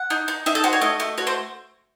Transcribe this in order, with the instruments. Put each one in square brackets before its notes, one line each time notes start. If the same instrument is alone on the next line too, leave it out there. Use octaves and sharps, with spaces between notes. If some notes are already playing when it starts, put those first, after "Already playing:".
Already playing: [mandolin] F#5
D#4
D#4
D#4 E5
A4
F#4 C5
C#5
A3 D#5
A3
F#4 C#5
C5